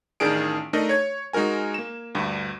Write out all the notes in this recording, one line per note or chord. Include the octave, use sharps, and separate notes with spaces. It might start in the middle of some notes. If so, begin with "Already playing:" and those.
A1 D#3 D4 G#4 D7
A3 D4 D#4 A#4 D#5
C#5 G#6
G#3 D#4 F#4 A#4 G#5
A#3 E7
D2 G2